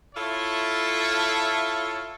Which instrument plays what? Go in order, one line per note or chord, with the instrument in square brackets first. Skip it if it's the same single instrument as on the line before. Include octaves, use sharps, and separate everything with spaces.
[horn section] E4 F4 A4 C#5 E5